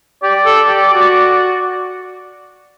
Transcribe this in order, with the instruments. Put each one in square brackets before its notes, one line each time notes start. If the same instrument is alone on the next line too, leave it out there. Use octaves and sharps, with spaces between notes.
[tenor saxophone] G4 [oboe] D5
[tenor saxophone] A4
G4
F#4